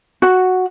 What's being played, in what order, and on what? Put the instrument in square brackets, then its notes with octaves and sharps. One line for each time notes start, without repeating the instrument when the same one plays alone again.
[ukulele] F#4